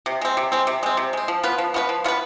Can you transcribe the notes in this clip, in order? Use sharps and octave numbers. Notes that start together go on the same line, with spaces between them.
C3
G#3 C4
C3
G#3 C4
C3
G#3 C4
C3
G#3 C4
F3
B3 F4 B4
F3
B3 F4 B4
F3
B3 F4 B4